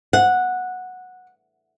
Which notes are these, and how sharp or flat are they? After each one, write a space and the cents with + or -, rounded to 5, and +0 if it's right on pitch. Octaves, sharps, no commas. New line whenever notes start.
F#5 -10